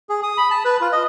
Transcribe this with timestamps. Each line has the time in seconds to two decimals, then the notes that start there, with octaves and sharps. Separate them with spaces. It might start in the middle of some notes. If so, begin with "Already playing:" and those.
0.09 G#4
0.23 D#6
0.38 B5
0.51 A5
0.65 B4
0.81 F4
0.92 D#5